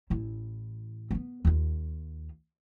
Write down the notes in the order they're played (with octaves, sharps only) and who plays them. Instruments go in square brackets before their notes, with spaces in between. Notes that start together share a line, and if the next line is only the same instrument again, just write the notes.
[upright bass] A1 E4
A#3 B3
D#2 F4